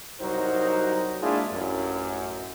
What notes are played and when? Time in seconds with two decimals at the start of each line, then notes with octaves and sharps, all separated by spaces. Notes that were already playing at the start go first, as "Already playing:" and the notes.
0.21 C2 F#3 D#4 F#4 A#4 C5
1.22 G#3 A#3 D4 E4 F4 G#4
1.52 A1 F#2